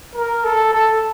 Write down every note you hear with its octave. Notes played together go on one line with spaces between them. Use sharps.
A#4
A4
A4